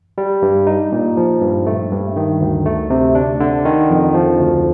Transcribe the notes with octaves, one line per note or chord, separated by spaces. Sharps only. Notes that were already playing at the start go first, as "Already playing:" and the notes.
G3
G2
D#4
A#2
F3
G2
A3
G2
D#3
D2
A3
C3
D4
D3
D#3
F2
F3
D2